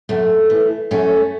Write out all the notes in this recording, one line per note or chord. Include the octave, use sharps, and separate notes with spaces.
F#2 A3
E3
F#2 A3 C#4